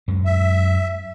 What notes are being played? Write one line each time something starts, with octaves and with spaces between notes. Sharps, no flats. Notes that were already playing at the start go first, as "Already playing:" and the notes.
F#2 G#3
E5